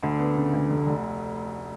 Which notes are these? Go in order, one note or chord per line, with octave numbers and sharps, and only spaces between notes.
D2 D3
B3
C#3
D2
F1
F1